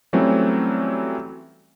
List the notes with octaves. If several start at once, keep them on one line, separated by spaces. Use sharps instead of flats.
E3 F#3 G3 A3 C4 C#4